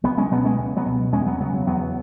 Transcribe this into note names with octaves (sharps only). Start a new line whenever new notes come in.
C#2 F#3 B3
G#3 C#4
B2 F#3 B3
G#3 C#4
C#2
F#3 B3
B2
E2 G#3 C#4
F#3 B3
C#3 F#3 B3
F#3
E2 F#3 B3